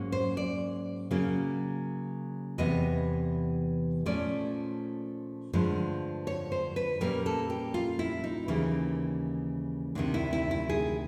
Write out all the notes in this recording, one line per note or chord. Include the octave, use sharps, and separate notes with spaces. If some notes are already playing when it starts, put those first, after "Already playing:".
Already playing: G#2 F#3 A#3 C#4
C5
D5
C#3 F#3 A#3 C#4
E2 C3 E3 G3 B3 D#5
A#2 F3 A3 C#4 D5
G2 D3 F3 G#3
C#5
C5
B4
A#2 G3 A#3 C#4 A#4
A4
G4
F4
E4
D#4
D#2 C#3 E3 G3 A#3
D2 C3 D#3 D4
E4
E4
E4
G#4